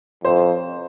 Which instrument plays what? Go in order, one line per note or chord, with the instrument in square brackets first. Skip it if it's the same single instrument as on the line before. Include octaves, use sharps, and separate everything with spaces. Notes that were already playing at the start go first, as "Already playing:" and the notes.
[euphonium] F2 [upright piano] C5